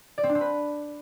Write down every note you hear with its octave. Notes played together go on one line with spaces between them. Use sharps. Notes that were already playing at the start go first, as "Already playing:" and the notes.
D5
C4
D4
C4
B4